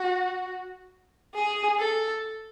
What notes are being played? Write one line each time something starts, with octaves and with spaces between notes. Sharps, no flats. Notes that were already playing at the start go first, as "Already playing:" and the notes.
Already playing: F#4
G#4
A4